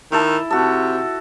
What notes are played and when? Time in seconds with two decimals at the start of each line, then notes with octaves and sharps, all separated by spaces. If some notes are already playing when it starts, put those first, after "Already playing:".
0.12 D#3 E4 A4
0.51 C3 F#4 A4